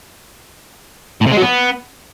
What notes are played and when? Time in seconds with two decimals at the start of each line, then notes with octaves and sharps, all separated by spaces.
1.21 A2
1.26 C3
1.31 G#3
1.37 F#3
1.42 B3